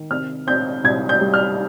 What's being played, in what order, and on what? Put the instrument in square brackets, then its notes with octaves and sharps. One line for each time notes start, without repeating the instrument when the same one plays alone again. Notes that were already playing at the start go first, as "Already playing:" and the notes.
Already playing: [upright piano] D#3
C3 F6
C4 G6
C2 G#6
G6
G3
F6